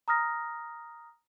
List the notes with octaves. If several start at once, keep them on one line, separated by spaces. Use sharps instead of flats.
A#5 D#6 F6 A#6